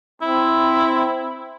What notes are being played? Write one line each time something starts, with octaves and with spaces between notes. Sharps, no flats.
C4 E4